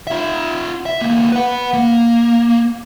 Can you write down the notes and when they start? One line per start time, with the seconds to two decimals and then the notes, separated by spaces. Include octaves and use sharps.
0.07 F4 E5
0.86 E5
1.00 D2 A#3
1.32 B4 F#5
1.74 A#3